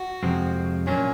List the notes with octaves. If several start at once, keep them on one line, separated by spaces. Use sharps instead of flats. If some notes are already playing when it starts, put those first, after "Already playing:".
Already playing: F#4
F2 C3 F3 G#3 C4
A#2 F#3 A#3 C#4 D4